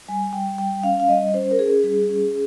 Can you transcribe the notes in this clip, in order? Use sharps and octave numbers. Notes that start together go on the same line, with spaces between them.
G3 G#5
G3 G5
G3 G5
C#4 F5
F5
G3 D#5
C#4 C5
A#4
C#4 G#4
G3 G#4
C#4